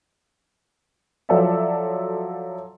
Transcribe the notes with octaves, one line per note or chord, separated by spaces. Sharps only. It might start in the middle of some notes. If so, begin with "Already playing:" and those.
F3 F#3 A4 D5 E5